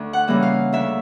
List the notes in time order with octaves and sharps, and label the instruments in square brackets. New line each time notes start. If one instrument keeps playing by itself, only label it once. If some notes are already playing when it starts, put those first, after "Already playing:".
Already playing: [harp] D2
F#5
C#3 E3 G3 A#3
F5
D2 E5